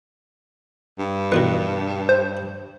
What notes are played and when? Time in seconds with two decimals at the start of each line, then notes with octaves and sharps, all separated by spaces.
0.99 G2
1.32 E2 B2 D#3 B4
2.09 C5